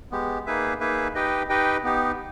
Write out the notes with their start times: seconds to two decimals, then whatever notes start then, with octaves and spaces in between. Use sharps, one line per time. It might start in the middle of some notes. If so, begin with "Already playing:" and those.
0.11 G#3 B3 G4
0.46 A#3 D#4 G#4 B4 E5
0.80 A#3 D#4 G#4 B4 E5
1.15 D#4 G4 B4 D#5 G5
1.49 D#4 G4 B4 D#5 G5
1.84 B3 D#4 G4